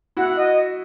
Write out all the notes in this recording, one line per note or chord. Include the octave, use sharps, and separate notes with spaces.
E4 F#4 F#5
D#5